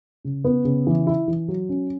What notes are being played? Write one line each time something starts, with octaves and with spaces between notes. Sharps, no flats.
C#3
B3
C#3
E3
E4
E3
F#3
C#4